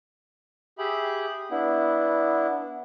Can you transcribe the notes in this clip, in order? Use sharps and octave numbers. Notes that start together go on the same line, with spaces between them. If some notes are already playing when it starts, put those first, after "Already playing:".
G4 G#4 E5 B5
B3 D4 E4